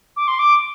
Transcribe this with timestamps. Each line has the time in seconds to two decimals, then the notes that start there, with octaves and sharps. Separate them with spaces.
0.17 D6
0.28 C6
0.39 D6